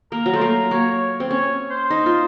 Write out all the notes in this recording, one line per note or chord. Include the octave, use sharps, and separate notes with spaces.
A#3 A#4
F#3
A3 C5
A#3 A#4
A#3 C#5
C#5
C4
C#4 C#5
C5
D#4
F4